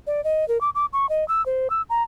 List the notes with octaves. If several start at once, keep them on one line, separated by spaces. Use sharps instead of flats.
D5
D#5
A#4
D6
D6
C#6
D#5
E6
C5
E6
A#5